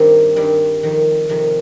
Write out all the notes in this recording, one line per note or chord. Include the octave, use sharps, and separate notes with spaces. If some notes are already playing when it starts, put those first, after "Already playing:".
Already playing: G2 D#3 G3 A#3 C4
G2 D#3 G3
F2 D#3
F2 C3 D#3